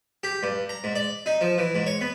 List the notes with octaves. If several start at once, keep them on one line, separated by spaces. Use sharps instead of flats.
G4
G2
A#5
G#2
D5
D#4
F3
E3
G#2
C#5
B3